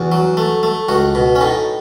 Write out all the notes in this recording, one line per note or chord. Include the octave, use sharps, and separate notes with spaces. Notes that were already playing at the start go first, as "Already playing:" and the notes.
Already playing: E2 F#4
F#3
A3
A3
C#2 F#4
B2
C#4
A2 D#4